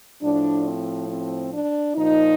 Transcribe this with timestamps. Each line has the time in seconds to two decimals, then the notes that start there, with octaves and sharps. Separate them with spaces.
0.22 A2 F3 D4
0.65 C4
1.10 C4
1.53 D4
1.96 A#2 F3 D#4